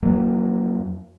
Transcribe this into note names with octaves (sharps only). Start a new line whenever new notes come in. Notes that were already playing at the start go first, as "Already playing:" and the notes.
F2 F#3 A#3